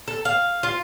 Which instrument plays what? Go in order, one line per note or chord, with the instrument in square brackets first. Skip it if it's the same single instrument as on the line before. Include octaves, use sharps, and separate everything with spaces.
[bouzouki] A4
F5
F4